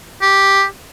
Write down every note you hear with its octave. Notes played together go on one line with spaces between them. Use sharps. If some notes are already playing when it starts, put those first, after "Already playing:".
G4